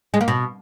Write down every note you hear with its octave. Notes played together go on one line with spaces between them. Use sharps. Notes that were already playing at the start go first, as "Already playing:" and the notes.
G#3
A#3
B2